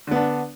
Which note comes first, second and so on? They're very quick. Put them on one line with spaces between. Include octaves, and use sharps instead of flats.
D3 B3 D4